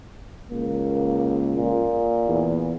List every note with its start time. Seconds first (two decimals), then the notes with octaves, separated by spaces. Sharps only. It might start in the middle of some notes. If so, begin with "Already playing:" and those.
0.51 C#2 A#3
1.54 A#2
2.27 E2